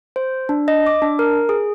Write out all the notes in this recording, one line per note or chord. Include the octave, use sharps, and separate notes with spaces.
C5
D4
D#5
D6
D4
A#4
G#4